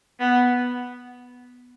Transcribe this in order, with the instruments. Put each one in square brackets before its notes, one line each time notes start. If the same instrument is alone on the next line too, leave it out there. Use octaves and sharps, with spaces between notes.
[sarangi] B3